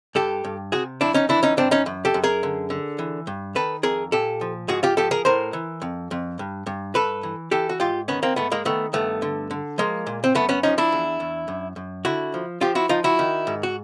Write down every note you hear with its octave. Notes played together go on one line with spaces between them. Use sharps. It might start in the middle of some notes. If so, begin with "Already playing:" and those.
G2 G4 A4
G2
C3 F#4 G#4
F2 D4 E4
C#4 D#4
E3 D4 E4
C#4 D#4
G#2 C4 D4
C#4 D#4
F#2
G4 A4
F#2
G#4 A#4
D3
D3
E3
G2
D#3 A4 B4
F2 G#4 A#4
A#2 G4 A4
F3
G#2 F#4 G#4
F4 G4
F3 G4 A4
G#4 A#4
A2 A#4 C5
E3
F2
F2
G2
G2
G2 A4 B4
E3
E3 G4 A4
F#4
G#2 F4 G4
D#3 B3 C#4
A#3 C4
G#2 A3 B3
G#3 A#3
D#3 A3 B3
G2 A3 B3
D3
D3
F3 G#3 A#3
A#2
C4
F#2 A3 B3
B3 C#4
F3 C#4 D#4
D4 E4
E2
E2
F#2
F#2
D3 E4 F#4
F3
F3 F4 G4
E4 F#4
F3 D#4 F4
E4 F#4
D#3
G#2
F#4